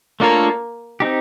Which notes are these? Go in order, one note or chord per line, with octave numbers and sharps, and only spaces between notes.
A3 A#3 D4 F4 A4 C#5
C4 D#4 G4